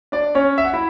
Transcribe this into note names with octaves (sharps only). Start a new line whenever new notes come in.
D4 D5
C#4 C#5
E5
F#5
E4 E5